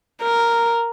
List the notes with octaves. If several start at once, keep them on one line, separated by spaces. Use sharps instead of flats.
A#4